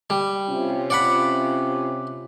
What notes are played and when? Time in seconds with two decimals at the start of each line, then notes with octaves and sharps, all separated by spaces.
0.10 G3
0.50 C3 C#4 F4
0.90 D5 F#5 B5